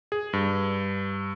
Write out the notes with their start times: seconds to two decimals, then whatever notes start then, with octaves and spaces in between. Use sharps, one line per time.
0.12 G#4
0.33 G2